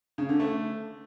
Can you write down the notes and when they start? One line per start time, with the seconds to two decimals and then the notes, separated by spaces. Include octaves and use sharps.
0.18 C#3
0.29 D3
0.40 A3